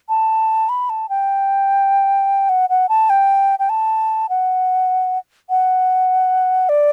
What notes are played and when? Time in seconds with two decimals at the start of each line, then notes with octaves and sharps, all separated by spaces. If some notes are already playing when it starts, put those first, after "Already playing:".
0.09 A5
0.69 B5
0.90 A5
1.09 G5
2.49 F#5
2.70 F#5
2.89 A5
3.10 G5
3.59 G5
3.69 A5
4.29 F#5
5.50 F#5
6.69 D5